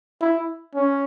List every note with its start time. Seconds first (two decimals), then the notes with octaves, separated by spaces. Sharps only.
0.21 E4
0.75 C#4